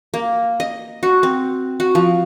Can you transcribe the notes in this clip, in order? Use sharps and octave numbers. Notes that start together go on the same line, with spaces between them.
A#3
D#5
F#4
C4
F#4
F3